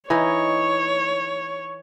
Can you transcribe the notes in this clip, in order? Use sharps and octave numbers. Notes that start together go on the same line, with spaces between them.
E3 D#4 C#5 D#5